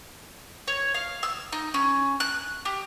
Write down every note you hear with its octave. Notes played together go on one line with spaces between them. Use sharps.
C#5
F5
E6
D#4
C#4
F#6
G4